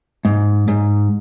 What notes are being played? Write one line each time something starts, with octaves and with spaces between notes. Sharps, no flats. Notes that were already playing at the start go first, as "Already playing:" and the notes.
G#2
G#2